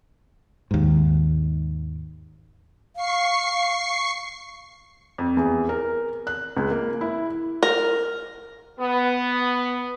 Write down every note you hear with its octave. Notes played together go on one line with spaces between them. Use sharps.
D#2 G#2
F5 C#6 C7
F2
E2
A#4
F#6
C#2
A#3
E4
A#4
B3